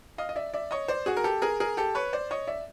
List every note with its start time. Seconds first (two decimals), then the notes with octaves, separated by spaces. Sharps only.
0.18 D#5 F5
0.29 D#5
0.36 D5 E5
0.54 D5 E5
0.71 C#5 D#5
0.88 C5 D5
1.06 F#4 G#4
1.17 A#4
1.24 G4 A4
1.42 G#4 A#4
1.60 G#4 A#4
1.77 G4 A4
1.95 B4 C#5
2.13 C5 D5
2.31 C#5 D#5
2.47 D5 E5